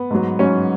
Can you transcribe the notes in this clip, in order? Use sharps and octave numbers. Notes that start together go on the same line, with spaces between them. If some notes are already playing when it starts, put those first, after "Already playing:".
Already playing: B3
G#2 F#3
G#2 F#3 C#4